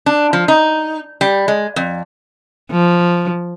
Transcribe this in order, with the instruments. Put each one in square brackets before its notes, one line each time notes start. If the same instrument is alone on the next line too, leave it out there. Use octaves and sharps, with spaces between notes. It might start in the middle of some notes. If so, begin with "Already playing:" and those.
[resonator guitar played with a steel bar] D4
F3
D#4
G3
G#3
F2
[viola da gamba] F3